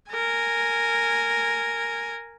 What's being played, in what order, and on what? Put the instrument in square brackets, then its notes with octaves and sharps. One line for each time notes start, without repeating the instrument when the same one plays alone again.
[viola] A#4 G#5